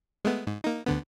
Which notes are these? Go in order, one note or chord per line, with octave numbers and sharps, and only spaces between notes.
G#3 A3 B3
G#2
A#3 D#4
D2 D3 B3